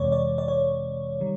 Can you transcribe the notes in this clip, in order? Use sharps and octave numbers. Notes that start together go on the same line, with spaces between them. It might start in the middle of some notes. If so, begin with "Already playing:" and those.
Already playing: F2 C3 E3 G#3 C#5 D5
D5
D5
C#5
D#3 G3